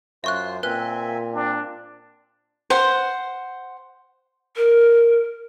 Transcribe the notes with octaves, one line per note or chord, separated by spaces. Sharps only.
F#2 F4 C5 E5 C#6 F#6
A#2 C4 B4 E5 G#5 F#6
C4 D4
C5 F#5
A#4